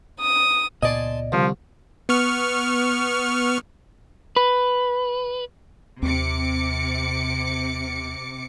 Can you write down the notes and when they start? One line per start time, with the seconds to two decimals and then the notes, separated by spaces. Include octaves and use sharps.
0.20 D#6
0.83 C#2 A#2 B3 D5 D#5 G#5 A5 C6
1.32 C2 D3 F3
2.09 B3 C#6 F6
4.36 B4
6.02 D#2 C3 C4 D6 C#7